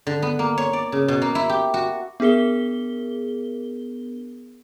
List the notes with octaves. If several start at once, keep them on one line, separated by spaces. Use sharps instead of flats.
D3
B3
A#3
C#5
D5
C#3
B2
A#3
E4
G4
F#4
B3 D4 G#4 A#4 G7